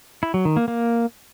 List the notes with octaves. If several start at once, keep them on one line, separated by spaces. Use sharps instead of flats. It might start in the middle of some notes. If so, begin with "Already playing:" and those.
E4
F#3
D#3
A#3
A#3